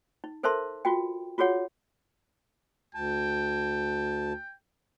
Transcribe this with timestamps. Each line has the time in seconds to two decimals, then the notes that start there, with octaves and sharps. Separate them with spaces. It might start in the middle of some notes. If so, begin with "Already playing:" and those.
0.24 D#4
0.43 A4 A#4 C5 E5 A5 C6
0.85 F4 F#4 G5
1.38 F4 F#4 G#4 C#5 F#5
2.95 D2 G5 A5